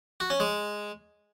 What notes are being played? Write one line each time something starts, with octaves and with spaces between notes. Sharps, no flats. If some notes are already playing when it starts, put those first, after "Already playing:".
F#4
C#4
G#3